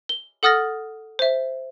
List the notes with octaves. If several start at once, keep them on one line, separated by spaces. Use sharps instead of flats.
G7
A4 F#5 D#6 F6 A6 A#6
C5 E5